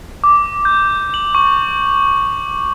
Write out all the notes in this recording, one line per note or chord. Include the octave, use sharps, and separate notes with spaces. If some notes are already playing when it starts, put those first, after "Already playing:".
D6
G6
F#7
C#6